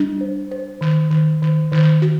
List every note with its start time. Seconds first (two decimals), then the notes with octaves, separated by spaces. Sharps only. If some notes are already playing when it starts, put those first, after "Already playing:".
Already playing: G3 D4
0.21 C5
0.51 C5
0.81 D#3
1.11 D#3
1.42 D#3
1.72 D#3
2.02 F#4